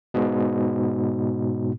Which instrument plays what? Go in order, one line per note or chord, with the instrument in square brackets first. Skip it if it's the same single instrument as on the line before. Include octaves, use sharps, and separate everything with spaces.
[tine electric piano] G#2 B2